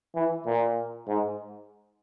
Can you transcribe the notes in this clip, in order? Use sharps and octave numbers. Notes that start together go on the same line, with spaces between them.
E3
A#2
G#2